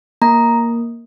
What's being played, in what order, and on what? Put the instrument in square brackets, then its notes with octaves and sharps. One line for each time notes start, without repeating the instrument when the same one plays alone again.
[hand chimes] A#3 A#5